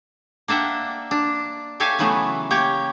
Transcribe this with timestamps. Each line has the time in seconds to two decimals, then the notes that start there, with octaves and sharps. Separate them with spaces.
0.48 A#3 D4 E5 F#5 G5
1.11 D4
1.80 G4 A4 C#5 E5 F5 G#5
1.99 C#3 E3 F#3 A3 B3
2.50 A#3 G4 C#5 G5